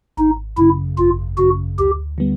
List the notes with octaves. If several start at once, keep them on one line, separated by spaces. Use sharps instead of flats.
G#1 D#4
F#2 C#3 E4
G#1 F4
F#2 C#3 F#4
D2 G4
D3 G3 B3